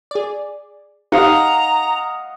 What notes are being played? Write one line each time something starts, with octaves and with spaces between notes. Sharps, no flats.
G#4 D5
D#4 G4 D#5 F5 F#5 A#5